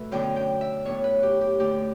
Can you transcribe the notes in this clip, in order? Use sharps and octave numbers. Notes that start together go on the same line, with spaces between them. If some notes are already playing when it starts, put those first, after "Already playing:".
Already playing: B2 A3 A4 B4 E5
F#2 D3 F#3 B3 D4 G5
G5
E5
A2 F#3 B3 D4 C#5
B4
G4
G4
F#2 D3 A3 G4